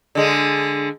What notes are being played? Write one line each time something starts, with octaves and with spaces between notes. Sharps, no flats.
D3 G#3